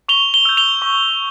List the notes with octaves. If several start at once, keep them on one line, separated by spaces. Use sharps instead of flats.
C#6 F7 G7
F7 G7
E6 G6
F7 G7
C#6